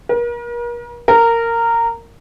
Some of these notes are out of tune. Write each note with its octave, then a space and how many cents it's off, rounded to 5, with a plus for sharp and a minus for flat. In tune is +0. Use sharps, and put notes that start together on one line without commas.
A#4 +40
A#4 -15